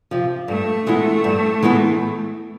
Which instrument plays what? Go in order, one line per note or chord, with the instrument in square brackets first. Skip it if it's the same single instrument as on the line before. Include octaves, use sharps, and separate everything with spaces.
[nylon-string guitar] C3 F3
[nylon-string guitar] G2 [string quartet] A3
[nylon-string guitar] E3 G#3 B3 E4
G2
E3 G#3 B3 E4